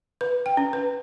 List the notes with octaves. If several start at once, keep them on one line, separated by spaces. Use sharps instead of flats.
B4
G5
C#4
B4